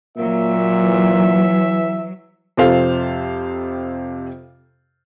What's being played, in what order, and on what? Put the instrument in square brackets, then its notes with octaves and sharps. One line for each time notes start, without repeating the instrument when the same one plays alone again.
[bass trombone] A#2 [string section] F#3 [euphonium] A#3 [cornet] E5
[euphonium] E3
[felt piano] F2 C3 A4 C5 F5